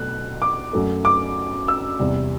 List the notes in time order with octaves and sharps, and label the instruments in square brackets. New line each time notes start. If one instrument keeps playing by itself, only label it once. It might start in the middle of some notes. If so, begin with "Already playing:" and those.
Already playing: [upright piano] B2 F#3 A3 F#6
D6
F#2 F#3 A3
D6
E6
E2 C3 G3